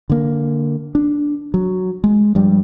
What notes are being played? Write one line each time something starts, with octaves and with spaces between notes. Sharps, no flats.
D3 A#3
D4
F#3
G#3
G2 F3 G3